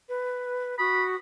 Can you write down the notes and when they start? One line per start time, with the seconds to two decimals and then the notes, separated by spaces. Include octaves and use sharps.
0.07 B4
0.79 F#4 B5 D#6